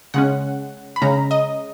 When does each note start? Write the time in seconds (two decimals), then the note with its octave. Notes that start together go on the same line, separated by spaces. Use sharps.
0.14 C#3 G#3 C#4 F#5
0.96 B5
1.02 C#3 G#3 C#4 A#5
1.31 D#5